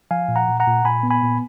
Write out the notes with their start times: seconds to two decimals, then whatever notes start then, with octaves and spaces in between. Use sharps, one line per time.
0.11 F3 F5 G#5
0.29 A#2
0.36 F#5 A#5
0.48 A#2
0.60 F#5 A#5
0.67 A#2
0.85 A#2 G#5 B5
1.03 B3
1.10 G#5 B5
1.23 A#2